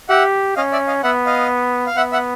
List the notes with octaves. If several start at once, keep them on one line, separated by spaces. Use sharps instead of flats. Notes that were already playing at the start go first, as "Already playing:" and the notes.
G4 E5 F#5
C#4 D#5 F5
D5 E5
D#5 F5
B3 E5 F#5
D#5 F5
F5
B3 E5 F#5
E5 F#5